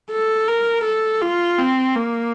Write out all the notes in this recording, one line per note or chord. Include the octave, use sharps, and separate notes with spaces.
A4
A#4
A4
F4
C4
A#3